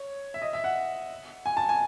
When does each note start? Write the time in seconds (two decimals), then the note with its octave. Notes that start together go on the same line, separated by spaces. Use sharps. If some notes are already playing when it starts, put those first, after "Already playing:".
Already playing: C#5
0.34 E5
0.42 D#5
0.53 E5
0.64 F#5
1.46 G#5
1.57 A5
1.69 G#5